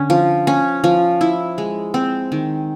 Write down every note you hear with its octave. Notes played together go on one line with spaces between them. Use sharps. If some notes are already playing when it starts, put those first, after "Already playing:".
Already playing: D3 C#4
F3
C#4
F3
E4
G#3
C4
D#3